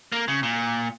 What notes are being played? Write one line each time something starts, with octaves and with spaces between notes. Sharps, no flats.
A#3
C#3
A#2